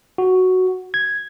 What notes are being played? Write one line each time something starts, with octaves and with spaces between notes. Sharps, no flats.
F#4
G#6